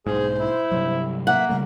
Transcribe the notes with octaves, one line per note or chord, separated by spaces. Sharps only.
B1 G#2 G#4 C5
E4
G2 C3 F#3
A#3 E5 F#5
C#3 G3 A3 A#4